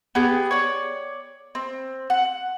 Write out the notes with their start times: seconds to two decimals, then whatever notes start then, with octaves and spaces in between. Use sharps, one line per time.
0.15 B3 G4 G#4
0.51 C#5 D5
1.55 C4
2.10 F#5